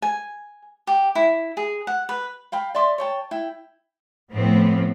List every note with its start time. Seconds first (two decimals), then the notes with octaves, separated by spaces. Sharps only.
0.02 G#5
0.87 G4
1.15 E4
1.57 G#4
1.87 F#5
2.09 B4
2.52 F5 G5 B5
2.75 D5 E5 C6 D6
2.98 C#5 G5 A5
3.31 E4 G5
4.31 A2 F3 B3 C4